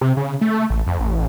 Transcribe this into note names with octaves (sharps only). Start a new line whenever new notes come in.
C3
C#3
A3
A1
F2
A1